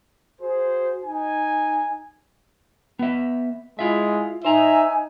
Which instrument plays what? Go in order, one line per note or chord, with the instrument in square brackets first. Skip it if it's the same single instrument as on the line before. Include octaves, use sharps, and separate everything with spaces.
[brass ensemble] F#4 G#4 C5
D#4 G#5
[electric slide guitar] B3 E5
[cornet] G#3 [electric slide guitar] E4 F4 E5
[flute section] D#4 G#5 [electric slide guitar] C5 A#5 [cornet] E5